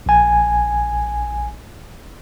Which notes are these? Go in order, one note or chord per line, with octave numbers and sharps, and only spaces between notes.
A#1 G#5